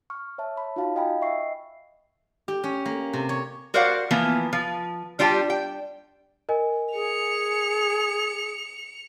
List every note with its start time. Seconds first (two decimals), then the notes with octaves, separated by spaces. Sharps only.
0.10 C#6 F6
0.38 C#5 E5 A5
0.56 C#5 B5
0.76 D#4 F4 F#4 F5 A5
0.96 D#5 F5 G5 G#5 B5
1.21 D#5 E5 C#6 C7
2.48 G4
2.64 C#4
2.85 A#3
3.13 C3
3.29 C#5
3.74 F#4 A#4 C5 D5 F5 F#5
4.11 E3 F3 A#3 B3
4.53 F3
5.19 G3 D4 F4 G4 G5
5.50 G5
6.49 A#4 D#5 G#5
6.94 G#4 C#7 F7